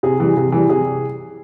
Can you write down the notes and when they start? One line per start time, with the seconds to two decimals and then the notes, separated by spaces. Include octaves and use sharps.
0.03 C3 G#4
0.20 E3 G3
0.37 C3
0.52 E3 G3
0.69 C3 G#4